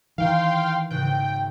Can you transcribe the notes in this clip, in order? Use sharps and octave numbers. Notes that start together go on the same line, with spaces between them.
D#3 E3 F5 G5 C6
G#1 C#3 G5 F#6